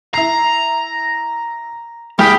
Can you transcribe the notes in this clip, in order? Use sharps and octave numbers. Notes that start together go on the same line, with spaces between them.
E4 A#5 C7
C2 G4 G#4 G5 B5 F6